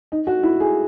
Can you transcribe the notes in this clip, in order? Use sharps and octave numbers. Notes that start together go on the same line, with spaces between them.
D#4
F#4
E4
G#4